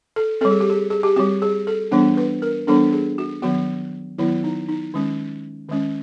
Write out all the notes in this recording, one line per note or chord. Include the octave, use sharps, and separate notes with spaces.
A4
G3 C4 A4
G#4
G4
G#4
G#4
G4
G3 C4 F#4
G#4
A4
E3 G3 B3 D4
B4
A#4
E3 G3 B3 D4 A4
G#4
F#4
D#3 F#3 B3 F#4
D#3 F#3 B3 E4
D#4
D#4
D#3 G#3 C#4
D#3 G#3 C#4